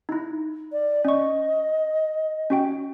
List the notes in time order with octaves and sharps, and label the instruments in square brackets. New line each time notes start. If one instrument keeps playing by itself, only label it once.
[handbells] D#4 E4
[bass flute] D5
[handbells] C#4 C#6 [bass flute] D#5
[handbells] C#4 F#4 G5